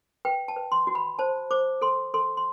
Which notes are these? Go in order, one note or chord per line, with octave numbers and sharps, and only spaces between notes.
B4 G5
A5
B4
C6
F#4
B5
C5 A5
C5 D6
A4 C6
A4 C6
C6